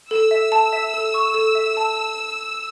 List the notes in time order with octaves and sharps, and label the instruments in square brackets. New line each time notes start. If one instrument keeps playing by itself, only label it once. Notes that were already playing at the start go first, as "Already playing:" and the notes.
[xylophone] A4 [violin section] E6
[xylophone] E5
A5
E5
A4
C#6
A4
E5
A5
A5